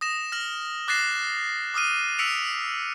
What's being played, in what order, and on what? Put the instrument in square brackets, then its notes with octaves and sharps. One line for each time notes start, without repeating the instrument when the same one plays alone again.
[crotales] D#6 A#6 E7
F6 A#6 F#7
D6 F#6 A6 A#6 C7 E7
D6 D#6 F6 D#7
E6 B6 C#7 D7 F7